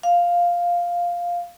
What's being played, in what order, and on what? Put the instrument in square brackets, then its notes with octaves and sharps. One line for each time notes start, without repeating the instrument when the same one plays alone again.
[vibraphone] F5